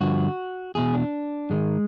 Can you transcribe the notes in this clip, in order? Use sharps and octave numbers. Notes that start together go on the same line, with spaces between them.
G2 D3 F3 F#4
E2 B2 G#4
D4
G#2 D#3 G#3